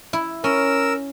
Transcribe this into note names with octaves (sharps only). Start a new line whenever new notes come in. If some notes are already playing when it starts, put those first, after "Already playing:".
E4
C#4 A#4 E6